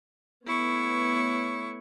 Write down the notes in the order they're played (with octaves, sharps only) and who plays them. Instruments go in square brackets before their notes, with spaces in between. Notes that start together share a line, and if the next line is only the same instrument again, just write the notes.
[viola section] A3 B3 C#5 [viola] E4 C#6